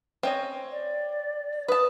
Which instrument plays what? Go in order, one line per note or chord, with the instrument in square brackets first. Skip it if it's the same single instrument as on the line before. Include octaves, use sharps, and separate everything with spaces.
[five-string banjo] C4 C#4 D#5
[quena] D5
[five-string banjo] B4 A5 [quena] D#6